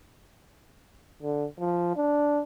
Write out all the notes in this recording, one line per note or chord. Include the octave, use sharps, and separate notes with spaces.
D3
F3
D4